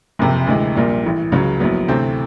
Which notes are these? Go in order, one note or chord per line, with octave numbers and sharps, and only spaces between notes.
F#1 F2 C3
D2 C3 E3 G#3
A#1 A#2 G3
A1 A2 E3
C#2 C#3 F#3
A#1 A2 F#3 B3
D2 C3 E3 A3 C4